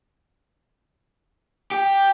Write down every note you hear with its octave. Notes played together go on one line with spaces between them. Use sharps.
G4